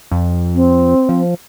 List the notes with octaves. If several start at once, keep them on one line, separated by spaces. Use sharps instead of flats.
F2
C4
F3